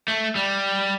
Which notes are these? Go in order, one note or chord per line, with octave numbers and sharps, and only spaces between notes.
A3
G3